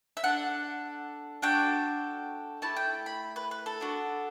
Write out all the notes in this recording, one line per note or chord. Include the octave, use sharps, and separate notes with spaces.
E5
D4 A4 F#5
D4 F#4 A4 G5
A3 E4 G4 A5
G5
B5
B4
B4
A4
B3 D4 F#4